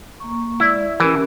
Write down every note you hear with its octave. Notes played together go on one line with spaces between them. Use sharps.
A#3 A#5 C#6
G#3 E4 D5
E3 C#4 G4 A#4